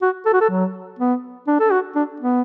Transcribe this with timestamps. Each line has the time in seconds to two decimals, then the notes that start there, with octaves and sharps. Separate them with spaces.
0.02 F#4
0.26 A4
0.33 F#4
0.41 A4
0.50 F#3
0.99 B3
1.47 D4
1.60 A4
1.72 F#4
1.95 D4
2.20 B3